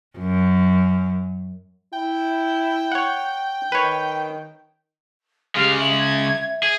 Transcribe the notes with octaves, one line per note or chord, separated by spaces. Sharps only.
F#2
E4 G5
C#5 F#5
D#3 B4 C#5
C#3 G#3 G4 F5
E5 F#7
G#6
G#4 G#6